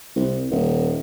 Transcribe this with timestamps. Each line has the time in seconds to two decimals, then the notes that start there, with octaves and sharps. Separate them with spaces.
0.16 C2
0.51 D#1